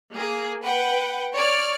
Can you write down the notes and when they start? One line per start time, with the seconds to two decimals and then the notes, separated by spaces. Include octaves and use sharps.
0.14 A#3 G#4
0.62 B4 F#5 G5
1.34 C#5 D5 F6